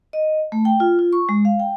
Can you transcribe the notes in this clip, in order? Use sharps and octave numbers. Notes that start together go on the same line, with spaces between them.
D#5
A3
G5
F4
F4
C#6
G#3
F5
G5